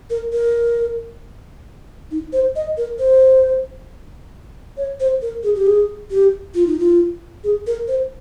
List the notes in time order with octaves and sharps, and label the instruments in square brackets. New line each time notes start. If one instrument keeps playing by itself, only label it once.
[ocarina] A#4
A#4
D#4
C5
D#5
A#4
C5
C#5
C5
A#4
G#4
G4
G#4
G4
F4
D#4
F4
G#4
A#4
C5